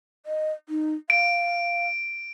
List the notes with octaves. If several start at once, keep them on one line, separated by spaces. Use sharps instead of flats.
D#5
D#4
F5 D7